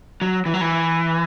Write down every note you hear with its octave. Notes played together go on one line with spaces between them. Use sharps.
F#3
E3
F#3
E3